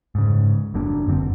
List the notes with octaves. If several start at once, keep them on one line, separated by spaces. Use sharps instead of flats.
G#2 C#3
F#1 F#2 A#3 D4
F1 F#2 D3 C4